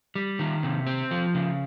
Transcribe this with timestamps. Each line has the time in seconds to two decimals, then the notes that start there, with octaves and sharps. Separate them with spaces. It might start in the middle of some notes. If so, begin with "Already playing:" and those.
0.15 G3
0.39 D#3
0.63 C3
0.87 C4
1.11 F3
1.35 C#3